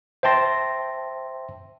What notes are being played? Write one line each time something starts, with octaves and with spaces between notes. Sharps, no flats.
C5 E5 G5 A5 C6 A#6